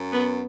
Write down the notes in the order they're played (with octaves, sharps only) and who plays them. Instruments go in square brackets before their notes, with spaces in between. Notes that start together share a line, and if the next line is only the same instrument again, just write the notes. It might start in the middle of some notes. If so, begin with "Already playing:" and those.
Already playing: [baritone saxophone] F#2
[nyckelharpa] B3